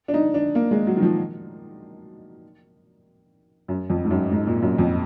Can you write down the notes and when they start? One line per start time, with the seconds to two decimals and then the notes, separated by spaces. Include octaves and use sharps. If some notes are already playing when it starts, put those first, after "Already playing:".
0.08 D4
0.14 D#4
0.34 D4
0.55 A#3
0.71 G#3
0.87 F#3
0.97 D#3
1.02 F3
3.68 F#2
3.90 F2
4.05 G#2
4.11 F#2
4.31 G#2
4.47 A#2
4.62 F#2
4.79 F2